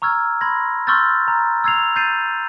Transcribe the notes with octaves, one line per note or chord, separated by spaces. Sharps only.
A#5 C#6 E6 F6 G#6
B5 C6 G#6 A#6
C6 C#6 E6 F6 G6 A6
A#5
E6 G#6 C7 F7
G6 A6 C7 D#7